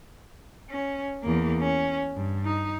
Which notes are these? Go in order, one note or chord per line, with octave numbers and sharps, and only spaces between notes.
C#4
E2 A#3
C#4
G2
D#4